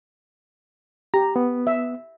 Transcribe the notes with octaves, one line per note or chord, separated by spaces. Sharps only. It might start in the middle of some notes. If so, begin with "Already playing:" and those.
G4 A#5
B3
E5